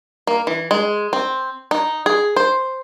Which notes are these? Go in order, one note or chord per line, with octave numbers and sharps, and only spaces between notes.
A#3
E3
G#3
C4
D#4
G#4
C5